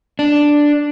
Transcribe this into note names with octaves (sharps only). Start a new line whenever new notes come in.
D4